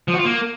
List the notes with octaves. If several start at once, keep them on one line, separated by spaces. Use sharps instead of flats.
F3
F#4
F4
A#3